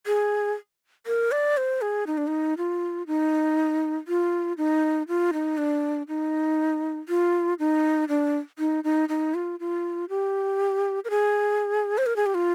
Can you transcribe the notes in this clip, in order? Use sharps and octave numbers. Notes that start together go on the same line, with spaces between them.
G#4
A#4
D5
C5
G#4
D#4
D4
D#4
F4
D#4
F4
D#4
F4
D#4
D4
D#4
F4
D#4
D4
D#4
D#4
D#4
F4
F4
G4
A#4
G#4
C5
A#4
G#4
G4
F4